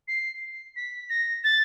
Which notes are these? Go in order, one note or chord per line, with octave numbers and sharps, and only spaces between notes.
C7
B6
A#6
A6